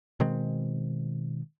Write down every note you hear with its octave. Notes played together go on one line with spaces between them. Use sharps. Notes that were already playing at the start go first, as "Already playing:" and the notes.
B2 D#3 G#3 C4